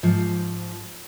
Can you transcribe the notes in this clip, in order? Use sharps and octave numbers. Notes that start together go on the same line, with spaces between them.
G#2 F3